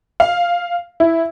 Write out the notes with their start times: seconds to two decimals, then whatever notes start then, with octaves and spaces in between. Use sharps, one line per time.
0.20 F5
1.00 E4